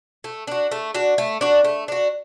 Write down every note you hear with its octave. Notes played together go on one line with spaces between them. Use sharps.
A3
D4 F#4
A3
D4 F#4
A3
D4 F#4
A3
D4 F#4